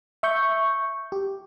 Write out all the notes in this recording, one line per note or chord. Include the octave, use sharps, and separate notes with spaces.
E5 C#6 G6
G4